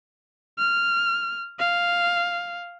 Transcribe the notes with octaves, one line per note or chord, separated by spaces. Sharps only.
F6
F5